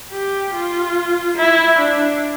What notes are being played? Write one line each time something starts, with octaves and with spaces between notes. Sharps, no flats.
G4
F4
E4
D4